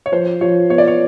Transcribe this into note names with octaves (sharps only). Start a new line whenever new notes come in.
C#5
F3 C5
F3 C#5
B3 C#5
D5
C#5